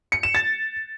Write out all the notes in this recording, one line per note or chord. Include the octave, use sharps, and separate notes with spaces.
C#7
E7
A6